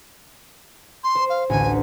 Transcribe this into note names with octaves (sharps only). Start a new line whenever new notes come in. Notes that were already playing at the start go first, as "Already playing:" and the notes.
C6
C5
F5
A1 D2 G#5